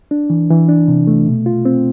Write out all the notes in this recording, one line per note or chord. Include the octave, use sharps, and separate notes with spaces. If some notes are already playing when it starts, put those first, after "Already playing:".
D4
E3
E3
D4
C3
A3
B2
F4
C4